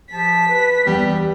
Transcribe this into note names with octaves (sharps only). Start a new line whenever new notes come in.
F3 G4 A5 B6
B4
E2 G3